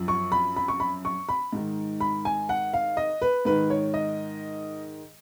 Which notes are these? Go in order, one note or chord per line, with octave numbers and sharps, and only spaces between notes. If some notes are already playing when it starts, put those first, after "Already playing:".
Already playing: F#2 F3
C#6
B5
B5
C#6
B5
C#6
B5
G#2 D#3
B5
G#5
F#5
F5
D#5
B4
G#2 D#3 B4
C#5
D#5